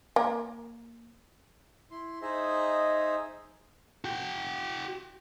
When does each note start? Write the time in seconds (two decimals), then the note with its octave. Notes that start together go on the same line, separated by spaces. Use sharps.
0.16 A#3 A#4
1.91 E4 C6
2.22 D#4 G#4 C5 D#5 E5
4.05 F#4 G5